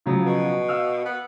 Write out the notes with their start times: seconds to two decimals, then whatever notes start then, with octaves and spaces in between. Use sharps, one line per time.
0.06 C#3 F3 F#3
0.26 B2
0.68 F5 E6 F6
1.05 B3